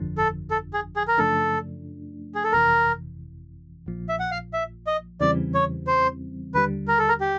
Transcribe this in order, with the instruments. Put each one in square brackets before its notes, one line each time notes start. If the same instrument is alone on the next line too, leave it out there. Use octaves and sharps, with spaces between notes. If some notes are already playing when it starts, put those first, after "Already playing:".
Already playing: [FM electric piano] G1 F2 D3 F3
[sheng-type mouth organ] A4
A4
G#4
G#4
A#4
[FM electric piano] F#2 C#3 F3 A3 D4 [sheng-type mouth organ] A4
[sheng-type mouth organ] G#4
A4
[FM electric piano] G1 F2 C3 E3 [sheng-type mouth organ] A#4
[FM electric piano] A#1 A#2 F3
[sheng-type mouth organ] E5
F#5
F5
E5
D#5
[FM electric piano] E2 C#3 E3 G3 C4 [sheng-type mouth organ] D5
[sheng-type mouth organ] C#5
C5
[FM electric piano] D#2 D3 G3 [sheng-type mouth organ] B4
[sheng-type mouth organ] A#4
A4
A#4
G4